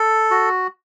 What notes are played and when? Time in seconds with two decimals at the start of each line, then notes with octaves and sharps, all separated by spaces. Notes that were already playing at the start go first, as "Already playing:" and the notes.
Already playing: A4
0.31 F#4